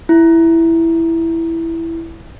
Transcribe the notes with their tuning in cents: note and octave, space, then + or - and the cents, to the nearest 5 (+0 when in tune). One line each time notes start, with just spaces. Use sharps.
E4 +5